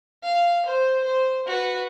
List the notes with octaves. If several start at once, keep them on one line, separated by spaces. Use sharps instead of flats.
F5
C5
C5
F#4 B4